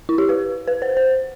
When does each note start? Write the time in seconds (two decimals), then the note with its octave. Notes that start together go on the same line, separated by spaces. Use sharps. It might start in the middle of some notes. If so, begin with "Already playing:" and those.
0.09 E4
0.18 G4
0.29 B4
0.68 B4
0.82 C5
0.97 C5